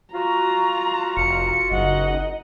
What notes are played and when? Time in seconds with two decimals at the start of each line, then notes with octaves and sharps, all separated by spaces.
0.14 F4 F#4 A#5
1.17 F1 C#7
1.71 F#1 D#4 D#5 F#5